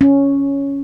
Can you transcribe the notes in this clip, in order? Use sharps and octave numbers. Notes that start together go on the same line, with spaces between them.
C#4